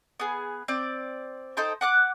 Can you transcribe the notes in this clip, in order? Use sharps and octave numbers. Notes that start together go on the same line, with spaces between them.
B3 G#4
C4 D5
D#4 A4 C5 G5
F#5 D6 F#6